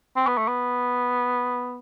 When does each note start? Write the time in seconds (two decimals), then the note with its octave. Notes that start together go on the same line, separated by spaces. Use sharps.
0.17 C4
0.27 B3
0.38 A3
0.48 B3